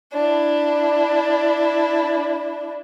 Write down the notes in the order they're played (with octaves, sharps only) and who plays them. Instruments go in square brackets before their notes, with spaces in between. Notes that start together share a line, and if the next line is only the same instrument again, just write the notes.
[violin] D4 E4